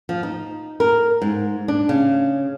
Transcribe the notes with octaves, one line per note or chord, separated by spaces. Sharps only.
F3
D#4
A#4
G#2
D4
C#3